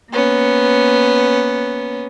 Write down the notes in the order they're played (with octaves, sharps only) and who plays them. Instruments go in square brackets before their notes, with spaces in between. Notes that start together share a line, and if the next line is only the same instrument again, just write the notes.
[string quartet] A#3 B3 C#4